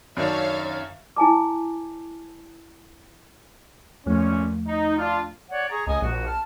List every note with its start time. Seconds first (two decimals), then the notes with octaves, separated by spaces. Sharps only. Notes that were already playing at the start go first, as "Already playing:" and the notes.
0.17 F#2 D#3 D4 C#5 E5 F5
1.16 E4 G#5 A5 D6
4.06 G1 E2 A#2 F3 A3 C#4
4.67 D#4
4.97 D4 F4
5.49 C#5 D5 F#5
5.69 G#4 A#5 C#6
5.87 C#2 D#5 G#5 D#6
6.01 A#1 F#4
6.25 A5 F6